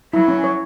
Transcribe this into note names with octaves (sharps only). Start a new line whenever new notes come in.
F#3 E4
C#4
C#5